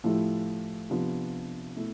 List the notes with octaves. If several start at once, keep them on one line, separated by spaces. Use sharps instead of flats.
A2 F3 A3 E4 G4
C3 F3 B3 D4
B2 A3 E4